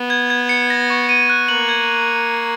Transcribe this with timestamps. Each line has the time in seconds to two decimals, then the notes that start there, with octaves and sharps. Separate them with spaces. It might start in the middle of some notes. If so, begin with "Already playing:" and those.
Already playing: B3
0.10 G#6
0.30 G#6
0.49 C#7
0.70 A#6
0.90 C#6
1.09 D#7
1.30 F#6
1.48 A#3 F#7
1.69 G#6
1.89 G#6